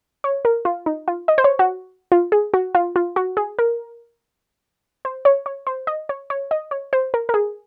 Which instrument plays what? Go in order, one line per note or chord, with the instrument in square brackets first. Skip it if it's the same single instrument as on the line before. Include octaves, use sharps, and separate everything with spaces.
[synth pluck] C#5
A#4
F4
D#4
F4
D#5
C5
C#5
F#4
F4
G#4
F#4
F4
F4
F#4
G#4
A#4
C5
C#5
C#5
C5
D#5
C#5
C#5
D#5
C#5
C5
A#4
A#4
G#4